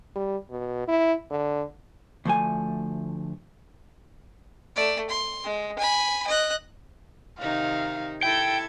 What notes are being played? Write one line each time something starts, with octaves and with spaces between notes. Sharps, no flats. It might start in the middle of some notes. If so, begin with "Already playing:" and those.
G3
B2
E4
D3
D2 F3 A3 G#5
A3 D5
C6
G#3
G#5 B5
D#5 F#6
C3 D#3 D#4 F5
E4 A4 G5 G#6